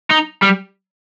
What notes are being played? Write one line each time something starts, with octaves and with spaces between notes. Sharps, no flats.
D#4
G3